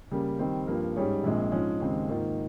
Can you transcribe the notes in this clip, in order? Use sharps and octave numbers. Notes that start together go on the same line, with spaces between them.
C#3 G3 A#3
D#3 G3 C4
G2 F3 A#3
G#2 G3 C#4 G#4 C#5
A#1 A#2 G#3 C4
G#2 F3 G#3 C#4
D#2 C#3 G#3 C4
G#2 D#3 A#3 F4